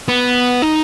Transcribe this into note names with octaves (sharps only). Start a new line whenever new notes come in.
B3
D#4